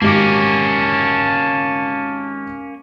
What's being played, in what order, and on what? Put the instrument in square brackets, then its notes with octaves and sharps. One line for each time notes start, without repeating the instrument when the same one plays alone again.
[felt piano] G#1 G4 D6 [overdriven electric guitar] A#3 C#4 [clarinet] A5